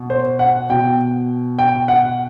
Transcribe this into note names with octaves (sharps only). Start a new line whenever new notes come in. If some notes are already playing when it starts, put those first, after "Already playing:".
Already playing: B2
C5
F#5
B2 G5
G5
F#5